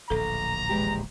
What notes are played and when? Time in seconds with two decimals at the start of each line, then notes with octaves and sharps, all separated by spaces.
0.10 D1 A#1 A4 A#5
0.69 E2 G#3 G4